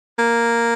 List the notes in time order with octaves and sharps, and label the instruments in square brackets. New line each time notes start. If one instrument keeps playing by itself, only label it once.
[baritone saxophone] A#3